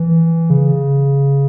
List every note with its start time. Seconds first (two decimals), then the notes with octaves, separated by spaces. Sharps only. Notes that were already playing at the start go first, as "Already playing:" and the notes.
Already playing: E3
0.50 C#3